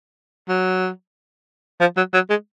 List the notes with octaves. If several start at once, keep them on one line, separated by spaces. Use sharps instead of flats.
F#3
F3
F#3
F#3
G#3